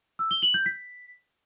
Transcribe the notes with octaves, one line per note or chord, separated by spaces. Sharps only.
E6
G7
F#7
G6
B6